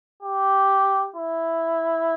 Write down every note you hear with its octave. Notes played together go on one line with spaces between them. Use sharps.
G4
E4